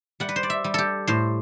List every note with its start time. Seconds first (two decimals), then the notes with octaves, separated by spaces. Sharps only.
0.20 G3 F#5
0.29 B4
0.36 C5
0.43 D5
0.50 E5
0.64 G3
0.74 G4 A4
1.07 A2 C5